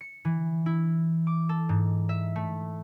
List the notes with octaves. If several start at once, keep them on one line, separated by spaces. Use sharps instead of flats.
C#7
E3
E4
D6
A4
G#2
E5
A3